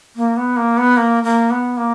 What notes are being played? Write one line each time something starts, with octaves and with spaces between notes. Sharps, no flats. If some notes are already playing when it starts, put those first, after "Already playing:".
A#3
B3
A#3
B3
A#3
A#3
B3
A#3